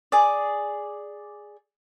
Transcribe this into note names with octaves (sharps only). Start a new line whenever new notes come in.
G#4 D5